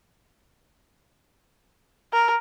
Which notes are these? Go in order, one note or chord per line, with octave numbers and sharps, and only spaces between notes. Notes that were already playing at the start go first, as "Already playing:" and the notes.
A#4